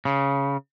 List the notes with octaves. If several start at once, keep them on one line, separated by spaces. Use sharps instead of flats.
C#3